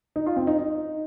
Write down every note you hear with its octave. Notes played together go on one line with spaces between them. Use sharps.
D#4
F4
C4
D#4
D#4